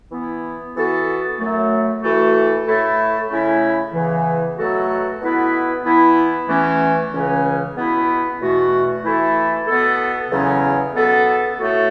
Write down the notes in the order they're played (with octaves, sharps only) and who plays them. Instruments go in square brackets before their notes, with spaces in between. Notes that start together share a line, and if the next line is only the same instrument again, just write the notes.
[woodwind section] E3 B3 E4
E3 B3 F#4 A4
F#2 F#3 A3
E3 A3 F#4 A4
A2 A3 E4 A4
C#3 A3 C#4 E4
E2 C#3 E3
B2 F#3 A3 F#4 A4
B2 B3 E4 B4
E3 B3 E4
E2 E3 A3 C#4
C#2 C#3 E3 C#4
B2 B3 E4
E2 B2 A3 F#4
E3 A3 E4 A4
B2 B3 A4
E2 C#3 F#3 C#4
B2 B3 A4
A2 A3 F#4 A4